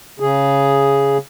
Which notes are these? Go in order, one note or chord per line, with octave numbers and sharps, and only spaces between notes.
C#3 G#4